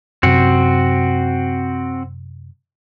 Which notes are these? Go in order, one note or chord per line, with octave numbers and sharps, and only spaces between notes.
F#2 C3 C4 F#4